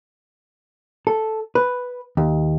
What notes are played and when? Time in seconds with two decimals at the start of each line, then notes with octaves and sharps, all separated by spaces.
1.07 A4
1.55 B4
2.17 D#2